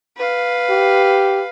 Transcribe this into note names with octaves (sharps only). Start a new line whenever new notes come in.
B4 F5
G4